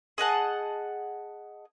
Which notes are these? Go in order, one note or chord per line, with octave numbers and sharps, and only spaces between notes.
G#4 D#5 F#5 A5